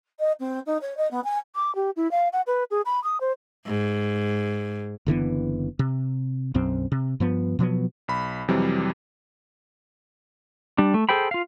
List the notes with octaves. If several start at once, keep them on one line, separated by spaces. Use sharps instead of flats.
D#5
C4
D#4
C#5
D#5
B3
G#5
D6
G4
E4
F5
F#5
B4
G#4
B5
D#6
C5
G#2
F#1 D3 E3 B3
C3
B1 F#2 C4
C3
G2 F3 B3
B2 F3 F#3 B3
B1 B5
F2 C3 E3 F#3 G3
G3 D4
A3
G#4 A4 C5 G5 B5
F4 F5